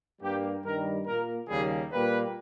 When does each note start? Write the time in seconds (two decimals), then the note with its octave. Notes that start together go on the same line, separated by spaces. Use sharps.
0.21 G2 G3 A#3 G4
0.64 G2 D#3 G3 A#4
1.06 A#2 A#3 A#4
1.48 D#2 C#3 G3 A#3 G#4
1.91 A#2 G3 A#3 B4